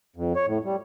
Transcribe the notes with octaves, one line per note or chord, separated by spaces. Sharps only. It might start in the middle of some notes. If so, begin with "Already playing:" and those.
F2
C#5
A2
G3